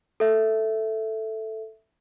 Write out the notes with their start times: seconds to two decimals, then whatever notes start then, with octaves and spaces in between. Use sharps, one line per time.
0.20 A4 E5